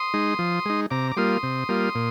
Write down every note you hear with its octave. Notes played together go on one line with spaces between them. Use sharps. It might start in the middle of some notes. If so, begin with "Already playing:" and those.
Already playing: C6 D#6
G#3 D#4
F3
G#3 D#4
C3 A#5 D6
D6
G3 A#3 F4 C6 D#6
C3
G3 A#3 F4
A#2